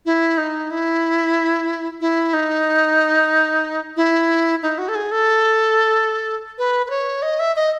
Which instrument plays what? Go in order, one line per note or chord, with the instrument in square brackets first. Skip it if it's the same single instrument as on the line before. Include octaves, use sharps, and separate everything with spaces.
[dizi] E4
D#4
E4
E4
D#4
E4
D#4
F#4
A4
G#4
A4
B4
B4
C#5
D#5
E5
D#5